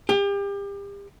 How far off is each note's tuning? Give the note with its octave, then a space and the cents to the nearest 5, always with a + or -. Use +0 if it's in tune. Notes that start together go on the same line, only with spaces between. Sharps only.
G4 +35